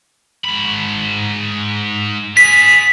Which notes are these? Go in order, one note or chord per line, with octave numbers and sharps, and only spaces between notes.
G#2 B5
F4 G#4 B6